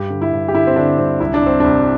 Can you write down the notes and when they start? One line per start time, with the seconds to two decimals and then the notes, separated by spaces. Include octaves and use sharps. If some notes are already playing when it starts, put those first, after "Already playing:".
Already playing: G2 G4
0.10 D3
0.22 E4
0.33 G2
0.48 G4
0.54 D3 E4
0.67 C4
0.76 D3 D4
0.98 G2 C4
1.20 C2 E4
1.34 D4
1.42 C2 C4
1.60 C2 D4